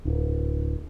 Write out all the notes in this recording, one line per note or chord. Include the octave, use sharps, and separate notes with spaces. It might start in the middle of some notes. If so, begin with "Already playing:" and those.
D1